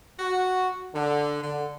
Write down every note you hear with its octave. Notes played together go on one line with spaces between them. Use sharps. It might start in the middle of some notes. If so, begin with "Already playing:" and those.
F#4
D3
D3